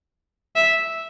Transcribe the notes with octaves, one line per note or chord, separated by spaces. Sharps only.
E5